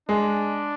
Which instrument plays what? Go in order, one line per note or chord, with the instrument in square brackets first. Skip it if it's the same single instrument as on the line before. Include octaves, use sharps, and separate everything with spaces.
[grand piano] G#3 [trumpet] D4